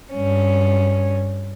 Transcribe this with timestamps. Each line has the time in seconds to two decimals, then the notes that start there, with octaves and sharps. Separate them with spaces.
0.15 G2 C#4